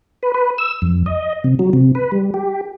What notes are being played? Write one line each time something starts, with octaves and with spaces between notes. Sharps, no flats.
B4
B4
E6
F2
D#5
C3
F#3
C3
B4
G3
G4